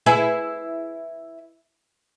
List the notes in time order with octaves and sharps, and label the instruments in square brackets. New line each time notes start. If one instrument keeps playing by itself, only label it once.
[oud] E4 G#4 B4